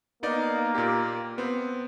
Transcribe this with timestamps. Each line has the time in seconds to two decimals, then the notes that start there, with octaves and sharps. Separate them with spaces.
0.23 A#3 B3 D#4 D5
0.75 A#2 G4
1.38 B3 C4